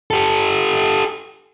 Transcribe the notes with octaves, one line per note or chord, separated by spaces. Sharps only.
G4 A4